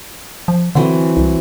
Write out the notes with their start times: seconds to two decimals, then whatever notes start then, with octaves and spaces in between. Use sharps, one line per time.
0.48 F3
0.75 D3 E3 F#3 C4
1.17 C2